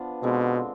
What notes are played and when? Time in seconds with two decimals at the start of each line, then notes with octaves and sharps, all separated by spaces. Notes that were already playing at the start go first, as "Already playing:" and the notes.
Already playing: F3 B3 D4
0.23 B2 D3 G#3 C4